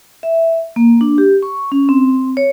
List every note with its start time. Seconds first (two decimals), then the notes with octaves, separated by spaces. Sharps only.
0.23 E5
0.76 A#3
1.01 D4
1.18 G4
1.43 C#6
1.72 C#4
1.89 C4
2.37 C#5